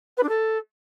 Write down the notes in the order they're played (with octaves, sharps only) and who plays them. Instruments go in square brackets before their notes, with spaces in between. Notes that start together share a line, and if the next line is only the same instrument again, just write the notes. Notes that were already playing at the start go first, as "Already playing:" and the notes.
[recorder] B4
D4
A4